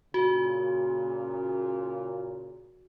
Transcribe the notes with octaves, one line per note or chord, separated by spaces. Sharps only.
A#2 C#3 F#4